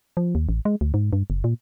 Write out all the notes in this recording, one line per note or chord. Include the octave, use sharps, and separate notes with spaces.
F3
D#2
A1
G#3
D2
G#2
G2
F#1
A#2